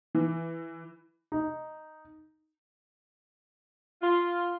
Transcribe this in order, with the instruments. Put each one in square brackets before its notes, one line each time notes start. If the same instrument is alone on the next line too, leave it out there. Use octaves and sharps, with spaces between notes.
[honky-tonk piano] E3
[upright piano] D#4
[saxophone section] F4